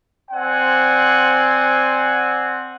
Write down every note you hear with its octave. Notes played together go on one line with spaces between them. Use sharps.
C4 C5 D5 F#5 G#5 C6